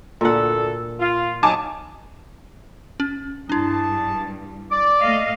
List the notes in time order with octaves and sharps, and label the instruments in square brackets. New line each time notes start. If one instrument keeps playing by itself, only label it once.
[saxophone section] D2 D3 A4 [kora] A#2 F#5
[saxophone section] F4
[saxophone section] F#3 D#4 [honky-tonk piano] G#5 A5 D6
[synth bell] C#4
[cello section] G2 [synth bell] D4 E4 [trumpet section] G#4 A5
[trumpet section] D5 [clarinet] D6
[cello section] A3 D#5 F5